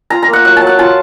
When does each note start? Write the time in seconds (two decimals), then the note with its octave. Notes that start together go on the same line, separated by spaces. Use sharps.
0.10 F4 A#5
0.23 A#5
0.28 A#3
0.33 F#5
0.45 F#3 F#5
0.57 A5
0.62 F#3
0.67 F#5
0.79 F4 A5